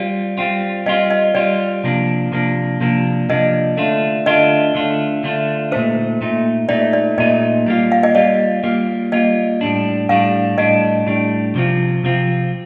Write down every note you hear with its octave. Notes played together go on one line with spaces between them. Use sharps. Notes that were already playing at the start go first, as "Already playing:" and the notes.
Already playing: G3 C4 F4 D5
G3 C4 F4
G3 C4 F4 D#5
D#5
G3 C4 F4 D5
C3 F3 A#3 D4
C3 F3 A#3 D4
C3 F3 A#3 D4
C3 F3 A#3 D4 D#5
D3 A3 D4 F4
D3 A3 D4 F4 D#5
D3 A3 D4 F4
D3 A3 D4 F4
A#2 A3 D#4 C5
A#2 A3 D#4
A#2 A3 D#4 D5
D5
A#2 A3 D#4 D#5
G3 A#3 F4
F5
D#5
G3 A#3 F4 D5
G3 A#3 F4
G3 A#3 F4 D#5
A2 G3 D4
A2 G3 D4 F5
A2 G3 D4 D#5
A2 G3 D4
C3 F3 C4 F4
C3 F3 C4 F4